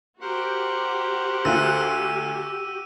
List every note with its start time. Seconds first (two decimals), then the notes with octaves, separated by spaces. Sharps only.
0.21 F#4 G4 A#4 C5 F#5
1.45 D2 F4 E6 F#6 D#7